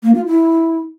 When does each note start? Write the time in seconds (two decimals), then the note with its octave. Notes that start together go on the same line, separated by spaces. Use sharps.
0.03 A#3
0.15 F4
0.26 E4